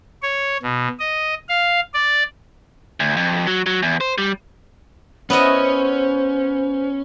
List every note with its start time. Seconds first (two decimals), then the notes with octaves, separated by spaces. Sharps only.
0.22 C#5
0.63 B2
0.99 D#5
1.49 F5
1.94 D5
3.00 D2
3.17 F2
3.47 F#3
3.66 F#3
3.83 E2
4.01 C5
4.18 G3
5.30 B3 C#4 E4 C5 D#5